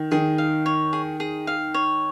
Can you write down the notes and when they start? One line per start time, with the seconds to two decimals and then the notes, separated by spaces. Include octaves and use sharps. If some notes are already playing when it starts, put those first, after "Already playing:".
Already playing: D#3
0.11 D#3 G#4
0.38 F5
0.66 C#5
0.93 G#4
1.20 G#4
1.47 F5
1.74 C#5